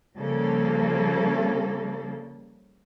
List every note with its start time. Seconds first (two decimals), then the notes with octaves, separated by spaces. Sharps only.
0.17 C#3 F3 G3 A#3 A4